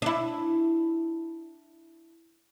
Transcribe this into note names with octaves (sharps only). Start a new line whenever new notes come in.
D4 E4